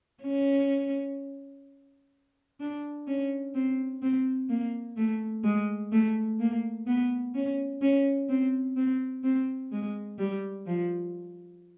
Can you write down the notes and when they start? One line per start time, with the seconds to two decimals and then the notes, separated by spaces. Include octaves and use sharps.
0.23 C#4
2.60 D4
3.07 C#4
3.55 C4
4.02 C4
4.49 A#3
4.97 A3
5.44 G#3
5.92 A3
6.40 A#3
6.87 B3
7.35 C#4
7.82 C#4
8.29 C4
8.77 C4
9.24 C4
9.72 G#3
10.19 G3
10.66 F3